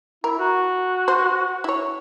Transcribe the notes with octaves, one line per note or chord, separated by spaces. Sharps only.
E4 A#4
F#4
C5
E4 C#5